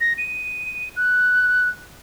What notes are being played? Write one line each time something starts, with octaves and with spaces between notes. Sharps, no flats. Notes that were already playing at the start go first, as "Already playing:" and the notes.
A#6
D#7
F#6